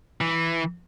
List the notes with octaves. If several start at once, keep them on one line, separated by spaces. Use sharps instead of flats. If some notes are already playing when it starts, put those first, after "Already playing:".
E3